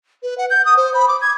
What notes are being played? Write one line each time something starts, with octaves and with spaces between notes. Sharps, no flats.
B4
F#5
G6
D#6
C5
B5
D6
G#6